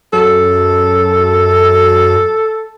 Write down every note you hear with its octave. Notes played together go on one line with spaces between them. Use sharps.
F#2 A4